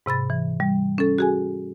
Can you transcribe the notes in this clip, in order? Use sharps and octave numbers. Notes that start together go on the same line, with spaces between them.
G#2 C3 B5 A6
E3
G3
C#4 A4
F#4 G#4 G#5